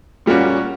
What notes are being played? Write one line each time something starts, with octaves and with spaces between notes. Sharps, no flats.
A#2 G3 A#3 C#4 F#4